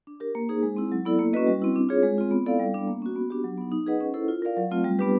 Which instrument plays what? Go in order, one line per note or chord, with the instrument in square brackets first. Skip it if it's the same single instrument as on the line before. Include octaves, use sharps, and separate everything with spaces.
[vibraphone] D4
G4 A#4
A#3
D#4 G#4 C5
G#3
C4 E4
F#3
B3 E4 A4 D5
A#3
C#4 F#4 B4 D#5
G3
C4 E4
D4
F4 G#4 C#5
G#3
C4 F4
B3
E4 A4 D5 F5
G3
B3 D4
A#3
C#4 F#4
B3
D4 G4
F#3
B3 D#4
D#4
G#4 B4 D#5 F#5
C#4
E4 A4 C5
F4
A#4 D5 F5
F#3
A3 C4 F4
G3
B3 D4 G4 B4